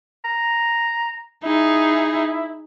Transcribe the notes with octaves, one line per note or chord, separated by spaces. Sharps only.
A#5
D#4 E4 G#4